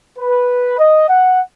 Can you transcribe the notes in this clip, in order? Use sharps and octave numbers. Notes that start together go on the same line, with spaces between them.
B4
D#5
F#5